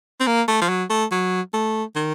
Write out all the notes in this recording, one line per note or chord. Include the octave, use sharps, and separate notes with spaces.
C4
A#3
A3
F3
F#3
A3
F#3
A3
D#3